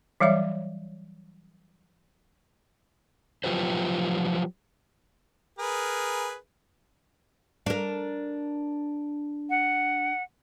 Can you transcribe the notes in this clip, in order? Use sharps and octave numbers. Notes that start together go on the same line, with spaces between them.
E3 F#3 G3 C#5 E5
F3 F#3 F4 G4 B4 C5
G#4 A#4 B4
D4 A#4
F#5